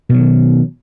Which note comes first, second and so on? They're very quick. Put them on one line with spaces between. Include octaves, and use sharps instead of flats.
B2 F#3 D#3